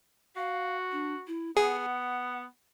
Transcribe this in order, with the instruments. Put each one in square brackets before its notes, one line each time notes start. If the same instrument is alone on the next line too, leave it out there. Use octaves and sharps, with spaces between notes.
[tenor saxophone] F#4 [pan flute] F5
[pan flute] D4
E4
[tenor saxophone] B3 [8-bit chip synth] G#4 [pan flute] F#5